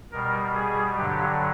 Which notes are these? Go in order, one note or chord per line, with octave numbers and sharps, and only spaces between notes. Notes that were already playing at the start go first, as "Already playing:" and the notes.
B2 G3 A#4
G#4
G2 D3 F#3 G4